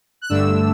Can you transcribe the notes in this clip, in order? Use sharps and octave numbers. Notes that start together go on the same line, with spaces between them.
F#6
G2 D3 A3 D4 E6